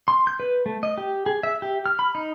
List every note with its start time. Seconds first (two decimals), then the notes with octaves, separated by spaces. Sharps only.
0.08 C6
0.27 G6
0.40 B4
0.66 A3
0.83 D#5
0.98 G4
1.26 G#4
1.43 E5
1.62 G4
1.86 F6
1.99 B5
2.15 D#4